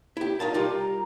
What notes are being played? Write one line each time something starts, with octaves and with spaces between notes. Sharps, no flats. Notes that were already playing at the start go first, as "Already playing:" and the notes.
E4 G4
D#4 F4 A#4 A5
G3 F4 G4
A#5